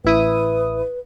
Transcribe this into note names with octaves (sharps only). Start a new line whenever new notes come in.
A1 E4 B4 D#6